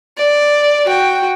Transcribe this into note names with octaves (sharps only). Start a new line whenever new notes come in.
D5
F#4 G5